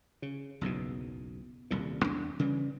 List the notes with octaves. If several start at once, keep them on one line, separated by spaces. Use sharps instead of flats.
C#3
F#1 B1 E2 B2
D#1 C2 A#2
E2 D4
C#3 E3 G3